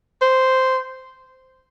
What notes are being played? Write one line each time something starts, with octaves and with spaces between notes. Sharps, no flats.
C5